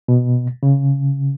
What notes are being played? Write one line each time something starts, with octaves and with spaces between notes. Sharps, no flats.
B2
C#3